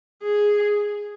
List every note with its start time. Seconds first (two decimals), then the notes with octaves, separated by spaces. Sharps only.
0.23 G#4